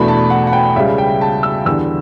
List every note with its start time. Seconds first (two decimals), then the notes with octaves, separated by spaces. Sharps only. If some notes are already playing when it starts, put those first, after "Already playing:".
Already playing: E2 B2 A3 D4 B5
0.08 A5
0.30 F#5
0.47 F#5
0.53 G5
0.76 C#2 C#3 G3 E5
0.98 G5
1.21 A5
1.43 E6
1.66 E2 D3 G3 E6